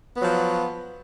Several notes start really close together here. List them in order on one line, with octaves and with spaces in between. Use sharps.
B3 F#3 F3